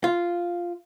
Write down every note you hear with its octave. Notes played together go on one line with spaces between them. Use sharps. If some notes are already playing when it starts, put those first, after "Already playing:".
F4